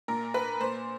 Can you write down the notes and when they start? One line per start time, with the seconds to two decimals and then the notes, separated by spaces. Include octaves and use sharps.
0.08 A#2 A#4
0.34 B4
0.61 A#2 C5